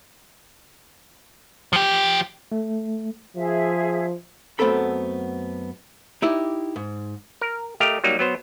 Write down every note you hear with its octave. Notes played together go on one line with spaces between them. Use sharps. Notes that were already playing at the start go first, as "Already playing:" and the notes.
F3 G4
A3
F3 G#4 E5
F#2 A3 B3 C4 A4 B5
D#4 E4 G4 D5
G#2
A#4
A3 G4 A#4 D#5 F5 G5
F#3 G3 A#3 D#4
F#3 B3 C5